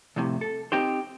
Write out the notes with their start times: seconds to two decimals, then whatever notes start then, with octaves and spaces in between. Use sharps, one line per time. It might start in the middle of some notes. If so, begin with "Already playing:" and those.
0.16 C2 F2 A2 C3
0.41 A4
0.72 C4 D#4 G4 C5